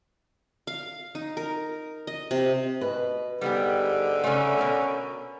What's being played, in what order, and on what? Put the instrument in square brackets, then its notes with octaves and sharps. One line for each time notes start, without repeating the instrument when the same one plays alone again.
[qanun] F5
D#4
A#4
D#5
C3
[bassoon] B2 [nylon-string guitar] B4
[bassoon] G#2 [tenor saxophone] D3 [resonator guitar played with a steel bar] G3 B3 G4
[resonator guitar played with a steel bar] C#3 A3 [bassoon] C#4
[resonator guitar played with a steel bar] B2 A#4